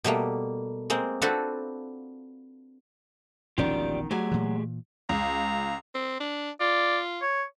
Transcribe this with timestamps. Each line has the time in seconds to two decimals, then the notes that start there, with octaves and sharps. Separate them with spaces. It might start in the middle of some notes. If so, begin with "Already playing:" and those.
0.04 B2 G3 A3 A#3
0.90 G#3 A#3 C4
1.22 C4 D4 F4 F#4 A4 B4
3.58 E1 A#1 B2 D#3 C#4 F4 G4 D5
4.11 F#3 A3 G4 G#4 G#5
4.32 A#2 E3
5.09 C#2 A#5
5.95 C4
6.20 D4
6.60 F4 D5
7.22 C#5